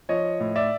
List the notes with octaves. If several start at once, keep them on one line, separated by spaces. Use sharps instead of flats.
F3 C#5 D#5
A2
D5 E5